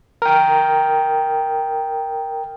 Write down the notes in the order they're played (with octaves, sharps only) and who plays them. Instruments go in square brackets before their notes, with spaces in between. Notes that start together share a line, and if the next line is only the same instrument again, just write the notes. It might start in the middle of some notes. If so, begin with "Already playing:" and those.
[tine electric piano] A#4 G5